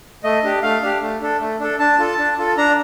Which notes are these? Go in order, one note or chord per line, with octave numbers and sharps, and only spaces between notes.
A3 D#5
D4 G4
A3 F5
D4 G4
A3
D4 A4
A3
D4 A4
D4 A5
F4 A4
D4
F4 A4
D4 A#5